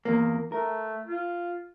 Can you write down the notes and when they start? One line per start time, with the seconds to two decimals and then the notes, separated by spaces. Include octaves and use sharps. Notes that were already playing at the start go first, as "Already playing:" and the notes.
0.05 E2 A#3
0.52 A3 A#4
1.06 F4